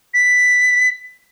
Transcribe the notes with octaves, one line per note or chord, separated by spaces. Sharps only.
B6